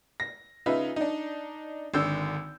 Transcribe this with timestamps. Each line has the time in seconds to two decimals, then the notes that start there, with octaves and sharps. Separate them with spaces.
0.20 A#6
0.66 C#3 D#4 F4 B4 E5
0.96 D4 D#4
1.94 G#1 D3 E6 G6